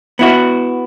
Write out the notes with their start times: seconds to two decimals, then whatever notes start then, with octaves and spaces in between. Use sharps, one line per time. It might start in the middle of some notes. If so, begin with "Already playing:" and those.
0.19 B3 E4 F#4